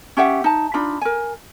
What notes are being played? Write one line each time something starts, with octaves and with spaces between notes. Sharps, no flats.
C#4 G4 E5 F#5
D#4 A5
D4 D#4 F4 B5
A#4 G#5